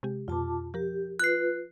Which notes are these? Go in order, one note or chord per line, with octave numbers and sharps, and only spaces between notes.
C3 G#3 G4
F2 B2 F4 A5 D6
F3 G4 A#4
F4 B4 F#6 C7